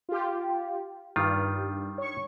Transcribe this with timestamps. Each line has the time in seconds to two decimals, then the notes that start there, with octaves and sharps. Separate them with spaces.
0.09 F4 G4
1.16 G2 D#3 G3 F4
1.98 C#5 C#6